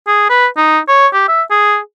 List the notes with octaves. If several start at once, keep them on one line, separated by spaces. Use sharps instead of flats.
G#4
B4
D#4
C#5
G4
E5
G#4